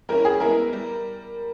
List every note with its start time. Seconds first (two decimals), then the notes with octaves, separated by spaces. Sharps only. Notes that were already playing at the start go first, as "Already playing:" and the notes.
0.09 E3 G3 C#4 E4 A#4
0.25 G#4
0.40 E3 G#3 B3 E4 A#4
0.73 G3